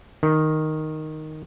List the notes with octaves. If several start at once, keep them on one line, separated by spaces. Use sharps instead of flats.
D#3